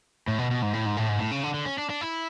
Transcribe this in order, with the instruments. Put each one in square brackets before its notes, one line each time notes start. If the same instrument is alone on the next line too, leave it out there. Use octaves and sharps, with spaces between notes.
[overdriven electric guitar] A2
B2
B2
G#2
A2
G#2
A2
G#2
A2
C#3
D3
D3
C#4
D4
D4
E4